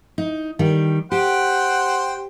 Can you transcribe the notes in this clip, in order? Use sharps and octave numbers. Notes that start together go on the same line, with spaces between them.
D#4
D#3 G3
G4 C5 F#5 G5